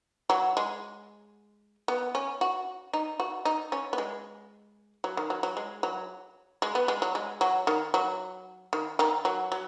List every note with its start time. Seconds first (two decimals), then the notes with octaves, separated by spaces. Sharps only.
0.30 F#3
0.57 G#3
1.88 B3
2.15 C#4
2.41 F#4
2.93 D#4
3.20 F#4
3.45 D#4
3.72 C#4
3.93 B3
3.98 G#3
5.04 F#3
5.17 D#3
5.30 F#3
5.43 F#3
5.57 G#3
5.83 F#3
6.62 G#3
6.75 B3
6.88 G#3
7.02 F#3
7.15 G#3
7.41 F#3
7.67 D#3
7.94 F#3
8.73 D#3
8.99 D#3
9.25 F#3
9.52 F#3